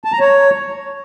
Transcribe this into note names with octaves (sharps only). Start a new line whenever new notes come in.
A5
A#5
C#5